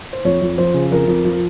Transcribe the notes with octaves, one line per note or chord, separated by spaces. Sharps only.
C5
F2 C#5
F2
F3 C5
C#3
F2 A#4
F2
F3